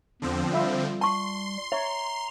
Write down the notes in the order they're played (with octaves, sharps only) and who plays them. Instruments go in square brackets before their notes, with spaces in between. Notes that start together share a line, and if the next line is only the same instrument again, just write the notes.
[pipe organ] E2 [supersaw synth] D3 F3 C4
[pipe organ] G3 [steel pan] F4 E5 B5
[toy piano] A5 C#6 [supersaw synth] C6
[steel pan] C#5 [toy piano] E5 [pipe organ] A#5